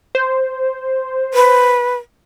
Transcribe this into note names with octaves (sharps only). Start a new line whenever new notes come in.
C5
B4